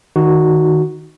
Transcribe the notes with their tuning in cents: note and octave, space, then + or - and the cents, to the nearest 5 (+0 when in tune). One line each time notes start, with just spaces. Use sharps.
D#3 +0 D#4 +0 F#4 +0